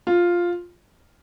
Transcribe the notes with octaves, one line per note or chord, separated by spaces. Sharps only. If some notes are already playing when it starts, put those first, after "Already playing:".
F4